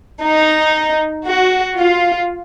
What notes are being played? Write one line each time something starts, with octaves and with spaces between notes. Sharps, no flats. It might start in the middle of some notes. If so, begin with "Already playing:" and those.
D#4
F#4
F4